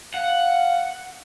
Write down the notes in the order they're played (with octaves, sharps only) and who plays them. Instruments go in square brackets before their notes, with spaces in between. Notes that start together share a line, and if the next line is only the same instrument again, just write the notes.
[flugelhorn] F5 [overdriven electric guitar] F#5